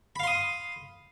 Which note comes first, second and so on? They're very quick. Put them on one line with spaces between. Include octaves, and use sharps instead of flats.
B5 F5 C6 D#6